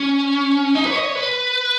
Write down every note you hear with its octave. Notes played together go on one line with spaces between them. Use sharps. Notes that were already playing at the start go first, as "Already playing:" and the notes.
Already playing: C#4
D#4
B4
C#5
D#5
C#5
B4